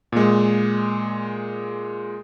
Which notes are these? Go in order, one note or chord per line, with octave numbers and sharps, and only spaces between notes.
A#2 G#3